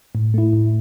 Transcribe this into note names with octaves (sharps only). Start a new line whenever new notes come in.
A2
A3 E4
A2